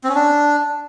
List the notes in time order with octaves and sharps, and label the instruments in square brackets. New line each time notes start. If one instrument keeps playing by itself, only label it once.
[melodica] C4
C#4
D4